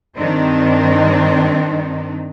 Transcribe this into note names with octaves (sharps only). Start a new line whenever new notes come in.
G2 D#3 C4 D4 D#4